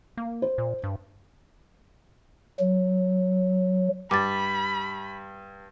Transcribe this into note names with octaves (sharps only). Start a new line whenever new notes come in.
A#3
C5
A#2
G2
F#3
G2 B5 D6 A6